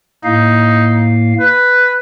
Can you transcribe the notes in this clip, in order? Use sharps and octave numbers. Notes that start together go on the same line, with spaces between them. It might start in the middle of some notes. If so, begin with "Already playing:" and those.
A2 A#3 D#4 F5
B4